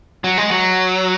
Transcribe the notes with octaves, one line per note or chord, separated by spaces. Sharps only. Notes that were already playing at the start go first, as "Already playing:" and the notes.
F#3
G#3
F#3